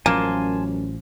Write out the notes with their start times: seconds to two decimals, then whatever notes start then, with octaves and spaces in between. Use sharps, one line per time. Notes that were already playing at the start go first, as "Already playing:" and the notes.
0.06 A1 F#2 F3 A#3 G#5 A5 C6